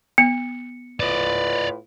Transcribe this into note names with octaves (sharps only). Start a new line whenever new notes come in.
B3 C#7
A2 F4 B4 D5 D#5